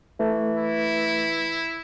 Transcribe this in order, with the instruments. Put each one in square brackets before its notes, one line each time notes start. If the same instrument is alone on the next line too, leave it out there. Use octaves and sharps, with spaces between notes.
[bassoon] E3 [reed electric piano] A3
[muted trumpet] E4